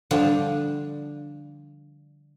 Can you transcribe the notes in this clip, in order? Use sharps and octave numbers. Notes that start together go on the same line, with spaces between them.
D3 F3 G3 D4